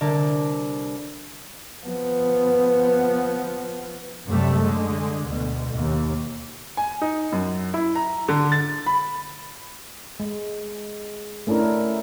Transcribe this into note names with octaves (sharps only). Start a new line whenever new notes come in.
C2 D3 D4 A#4 D5 D6
F3 B3
F#2 C3 G3 A3
D3 G#3
D2 B2
D#2
G#5
D#4
F#2
E4
A#5
D3
A6
B5
G#3
A3 C#4 D4 E4 A#4